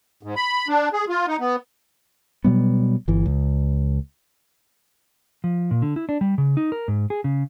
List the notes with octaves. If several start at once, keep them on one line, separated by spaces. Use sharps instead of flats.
G#2
B5
D4
G#4
F4
D#4
B3
B2 F#3 G3 B3
G1 E3
C#2
F3
A#2
D3
E4
D4
G3
C#3
D#4
A#4
G#2
G#4
C#3